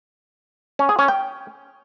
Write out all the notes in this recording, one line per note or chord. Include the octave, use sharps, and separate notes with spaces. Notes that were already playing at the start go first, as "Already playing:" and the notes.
C#4
G#4
C#4
G5